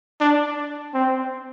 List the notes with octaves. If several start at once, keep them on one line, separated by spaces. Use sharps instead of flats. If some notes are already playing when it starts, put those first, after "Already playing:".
D4
C4